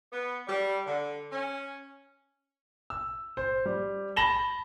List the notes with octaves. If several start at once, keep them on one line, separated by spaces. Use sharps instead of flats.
B3
G3
D3
C#4
E6
C5
G3
A5 B5 A#6 E7 F#7 G7